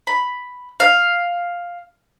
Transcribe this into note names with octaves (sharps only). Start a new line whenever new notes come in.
B5
F5